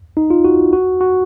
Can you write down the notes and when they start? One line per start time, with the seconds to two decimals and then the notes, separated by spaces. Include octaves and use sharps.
0.17 D#4
0.30 F4
0.44 F#4
0.73 F#4
1.01 F#4